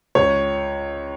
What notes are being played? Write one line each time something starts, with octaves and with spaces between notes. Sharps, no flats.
C#2 C#5